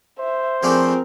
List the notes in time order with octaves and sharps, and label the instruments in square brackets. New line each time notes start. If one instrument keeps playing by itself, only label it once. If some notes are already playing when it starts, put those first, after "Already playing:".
[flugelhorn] C5 [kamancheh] E5
[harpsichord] F3 A3 D4 [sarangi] C4 [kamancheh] G#4 A#4